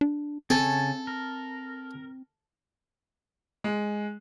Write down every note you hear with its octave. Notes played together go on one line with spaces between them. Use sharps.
D4
C#3 C4 A4 G#5 A5
A#4
G#3